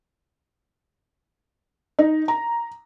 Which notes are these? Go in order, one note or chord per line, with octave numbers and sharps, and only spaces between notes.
D#4
A#5